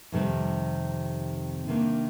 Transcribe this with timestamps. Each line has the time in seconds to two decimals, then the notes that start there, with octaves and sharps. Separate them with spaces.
0.12 F2 C3 D#3 G3 C4
1.67 C3 D#3 A#3 D4